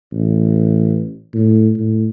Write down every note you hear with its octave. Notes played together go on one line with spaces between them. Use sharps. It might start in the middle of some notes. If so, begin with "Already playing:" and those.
A1
A2
A2